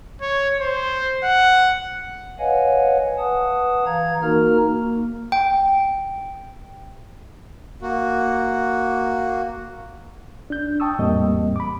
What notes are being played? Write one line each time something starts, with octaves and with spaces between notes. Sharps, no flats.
C#5
C5
F#5
B4 C#5 D#5 F5 F#5 G#5
B4 F#5 A5 D#6
E3 F5 A#5 G#6
A#3 D#4 F#4 A#4 A#5 F6
A#3
G5
A#3 F#4
D4 G6
G5 A5 C#6 D#6 E6
E2 A2 G3 A#3 C4 D#5
B5 D6